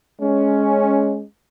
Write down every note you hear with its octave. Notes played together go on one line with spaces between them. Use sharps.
G#3 C#4